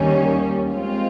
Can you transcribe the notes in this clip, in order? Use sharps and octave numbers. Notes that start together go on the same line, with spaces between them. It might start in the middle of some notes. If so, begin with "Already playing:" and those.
Already playing: D#2 D#3 G3 A#3 C#4
F3 G#3 C4 F4